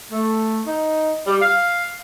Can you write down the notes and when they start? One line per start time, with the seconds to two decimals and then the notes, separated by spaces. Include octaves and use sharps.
0.12 A3
0.66 D#4
1.26 G3
1.40 F5